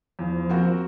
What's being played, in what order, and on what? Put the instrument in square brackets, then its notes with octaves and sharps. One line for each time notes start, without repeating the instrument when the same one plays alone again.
[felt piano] E2 [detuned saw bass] F3
[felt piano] A#3 C4 F#4